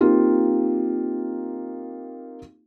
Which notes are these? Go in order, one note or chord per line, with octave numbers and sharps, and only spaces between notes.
A#3 C4 D#4 F4 G4